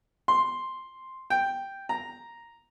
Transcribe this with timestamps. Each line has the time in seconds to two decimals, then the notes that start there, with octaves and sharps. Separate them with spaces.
0.28 C6
1.30 G5
1.89 A#5